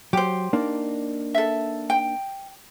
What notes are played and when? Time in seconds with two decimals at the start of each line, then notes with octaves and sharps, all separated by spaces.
0.13 F#3 G4 C5
0.53 A#3 D4 D#4
1.34 A4 E5
1.90 G5